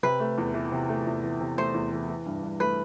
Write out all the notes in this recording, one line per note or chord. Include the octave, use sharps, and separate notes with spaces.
C3 B4
A3
E2
E3
C3
A3
E2
E3
C3
A3 C5
E2
E3
E3
G2
G2
A3 B4